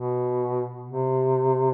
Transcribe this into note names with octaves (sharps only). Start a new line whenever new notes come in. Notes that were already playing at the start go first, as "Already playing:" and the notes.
Already playing: B2
C3